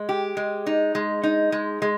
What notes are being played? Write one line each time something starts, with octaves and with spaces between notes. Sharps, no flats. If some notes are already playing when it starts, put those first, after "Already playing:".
Already playing: G#3
G4
G#3
D#4
G#3
D#4
G#3
G#3